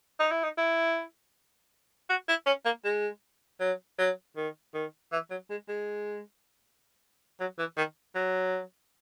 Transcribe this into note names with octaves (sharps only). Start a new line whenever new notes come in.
D#4
E4
D#4
E4
F#4
E4
C#4
A#3
G#3
F#3
F#3
D#3
D#3
E3
F#3
G#3
G#3
F#3
E3
D#3
F#3